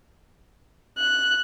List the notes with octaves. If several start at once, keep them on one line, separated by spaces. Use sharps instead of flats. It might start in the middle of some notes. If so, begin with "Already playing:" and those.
F#6